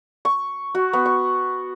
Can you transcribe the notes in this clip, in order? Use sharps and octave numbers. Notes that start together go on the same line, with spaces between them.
C#6
F#4
B3
C#6